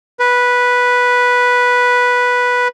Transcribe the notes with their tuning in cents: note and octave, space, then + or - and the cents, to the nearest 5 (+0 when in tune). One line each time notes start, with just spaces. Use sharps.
B4 -5